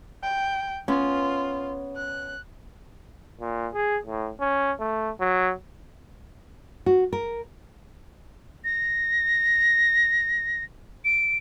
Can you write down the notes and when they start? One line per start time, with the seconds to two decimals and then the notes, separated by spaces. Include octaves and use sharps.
0.23 G5
0.88 B3 C#4 F4
1.97 F#6
3.41 A#2
3.74 G#4
4.06 A2
4.40 C#4
4.80 A3
5.20 F#3
6.86 F#4
7.13 A#4
8.64 A#6
11.05 D7